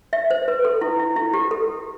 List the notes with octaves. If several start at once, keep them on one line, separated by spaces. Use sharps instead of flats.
E5
C5
B4
A4
E4
E4
E4
G4
A4